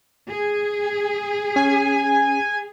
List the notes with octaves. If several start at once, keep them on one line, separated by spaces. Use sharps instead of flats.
G#4
C#4 G#5